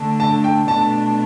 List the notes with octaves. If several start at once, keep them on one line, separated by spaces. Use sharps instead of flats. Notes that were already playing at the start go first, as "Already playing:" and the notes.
Already playing: D3 A3 D4
A5
G5
B2 A3 D4 A5